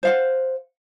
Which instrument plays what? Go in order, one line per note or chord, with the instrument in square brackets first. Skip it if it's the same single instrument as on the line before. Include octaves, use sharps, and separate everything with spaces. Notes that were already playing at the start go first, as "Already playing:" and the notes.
[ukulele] C5 F5 F#5